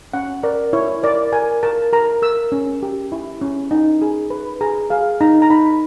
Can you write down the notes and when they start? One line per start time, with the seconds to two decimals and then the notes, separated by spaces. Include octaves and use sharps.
0.14 C#4 F#5
0.43 A#4 D5
0.73 E4 C#5
1.03 A#4 D5
1.32 A#4 G#5
1.63 A#4 A5
1.92 A#4 A#5
2.22 A#4 E6
2.52 C#4
2.83 G4
3.12 E4
3.41 C#4
3.71 D#4
4.02 G#4
4.30 B4
4.61 G#4 A#5
4.90 G#4 F5
5.21 D#4 A#5
5.42 A#5
5.50 D#4 B5